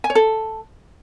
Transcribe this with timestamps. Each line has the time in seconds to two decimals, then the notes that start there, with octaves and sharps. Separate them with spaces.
0.04 G#5
0.10 C#5
0.15 A4